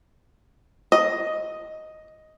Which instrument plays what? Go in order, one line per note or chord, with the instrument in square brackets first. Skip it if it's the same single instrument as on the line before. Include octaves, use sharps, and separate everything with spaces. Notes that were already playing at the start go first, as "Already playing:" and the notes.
[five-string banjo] D#5